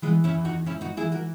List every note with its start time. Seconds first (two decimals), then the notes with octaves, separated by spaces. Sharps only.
0.02 E3 G#3 B3
0.24 C#4 E4
0.35 E2
0.45 D#4 F#4
0.66 G#2 C#4 E4
0.81 D#4 F#4
0.97 E3 E4 G#4
1.12 F#4 A#4